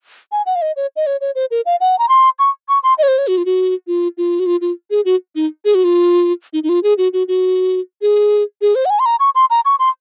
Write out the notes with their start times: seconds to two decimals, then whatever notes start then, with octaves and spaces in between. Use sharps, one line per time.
0.32 G#5
0.46 F#5
0.56 F5
0.62 D#5
0.76 C#5
0.96 D#5
1.06 C#5
1.21 C#5
1.35 C5
1.51 A#4
1.66 F5
1.81 F#5
1.99 A#5
2.09 C6
2.39 C#6
2.69 C#6
2.83 C6
2.98 D#5
3.03 C#5
3.08 C5
3.18 C#5
3.28 F#4
3.38 F4
3.46 F#4
3.87 F4
4.17 F4
4.39 F#4
4.46 F4
4.61 F4
4.90 G#4
5.05 F#4
5.35 D#4
5.65 G#4
5.75 F#4
5.84 F4
6.53 D#4
6.63 D#4
6.69 F4
6.83 G#4
6.98 F#4
7.13 F#4
7.28 F#4
8.02 G#4
8.62 G#4
8.75 C5
8.85 F#5
8.90 G#5
8.99 C6
9.06 A#5
9.20 C#6
9.35 C6
9.50 A#5
9.65 C#6
9.79 C6